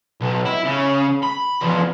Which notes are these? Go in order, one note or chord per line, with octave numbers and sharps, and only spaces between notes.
B1
E4
C#3
B5
E2 F3